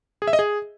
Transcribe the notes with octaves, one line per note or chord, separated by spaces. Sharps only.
G#4
E5
D#5
G#4